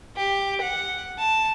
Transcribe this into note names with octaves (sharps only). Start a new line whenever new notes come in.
G4
F#5
A5